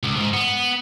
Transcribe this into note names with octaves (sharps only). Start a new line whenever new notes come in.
C#2
G#2
B3